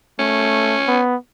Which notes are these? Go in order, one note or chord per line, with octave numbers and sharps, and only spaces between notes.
A3 C#4
B3